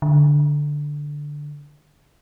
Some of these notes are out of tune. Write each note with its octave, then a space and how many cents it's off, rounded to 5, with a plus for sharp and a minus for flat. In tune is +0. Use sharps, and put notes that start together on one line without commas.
D3 +0